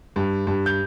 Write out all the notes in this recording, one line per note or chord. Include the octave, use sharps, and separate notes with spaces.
G2
G2
G6